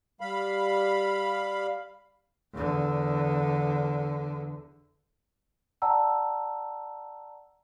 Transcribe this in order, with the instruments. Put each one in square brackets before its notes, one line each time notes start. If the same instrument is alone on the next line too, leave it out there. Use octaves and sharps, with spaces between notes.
[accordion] G3 F5 B5
[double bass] E2 D3
[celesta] D5 F#5 G5 A5 A#5 E6